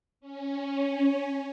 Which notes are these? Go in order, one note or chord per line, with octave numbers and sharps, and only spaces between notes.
C#4